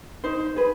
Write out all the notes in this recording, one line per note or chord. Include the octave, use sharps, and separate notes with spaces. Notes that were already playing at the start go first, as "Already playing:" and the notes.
D#4 C5
G#4 B4